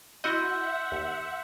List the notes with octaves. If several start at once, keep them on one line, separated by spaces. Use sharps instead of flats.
E4 F#4 D#5 E5 F#5 C6 E6 G6
D#2